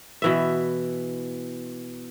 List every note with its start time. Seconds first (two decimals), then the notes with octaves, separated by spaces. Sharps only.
0.22 B2 E3 E5